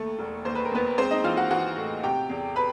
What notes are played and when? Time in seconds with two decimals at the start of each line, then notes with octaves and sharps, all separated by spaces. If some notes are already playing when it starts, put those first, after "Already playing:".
Already playing: D#2 A3 A4
0.19 E1
0.45 D#2 C5
0.55 B4
0.65 A#4
0.71 D#2 B3 B4
0.98 G#3 C4 C5
1.11 D#4 D#5
1.24 E3 F4 F5
1.37 F#4 F#5
1.51 E3 F#4 F#5
1.77 A2
2.03 C3 G4 G5
2.29 E2
2.56 B4 B5